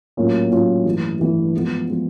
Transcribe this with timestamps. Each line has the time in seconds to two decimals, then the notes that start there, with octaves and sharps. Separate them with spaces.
0.17 A2 F#3 A#3 C#4 F4
0.51 A2 F#3 A#3 C#4 F4
0.85 G2 E3 A3
1.19 G2 E3 A3
1.53 F3 G#3 B3
1.88 F3 G#3 B3